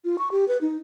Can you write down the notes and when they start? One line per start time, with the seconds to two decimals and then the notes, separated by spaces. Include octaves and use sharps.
0.05 F4
0.19 C#6
0.31 G4
0.48 B4
0.61 D#4